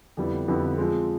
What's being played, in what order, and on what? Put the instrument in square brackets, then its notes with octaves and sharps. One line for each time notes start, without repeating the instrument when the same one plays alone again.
[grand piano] F2 D3 G3 B3 E4
F2 D3 G3 B3 E4
F3 G#3 C4